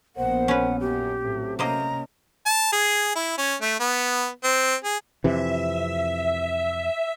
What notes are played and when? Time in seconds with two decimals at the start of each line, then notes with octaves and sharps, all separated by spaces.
0.16 A#1 B3 A#4 C5 F#5
0.48 C#4 B4
0.80 F#2 F#3 G4
1.23 A2 F#3 A3 C4
1.59 C3 A#3 C#4 C5 D#5 A#5
2.46 A5
2.72 G#4
3.15 E4
3.38 C#4
3.61 A3
3.80 B3
4.44 C4
4.84 G#4
5.24 F2 C3 E3 E5